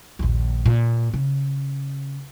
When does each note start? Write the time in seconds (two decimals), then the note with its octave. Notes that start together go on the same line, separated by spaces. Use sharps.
0.19 A#1 D#2
0.66 A#2
1.14 C#3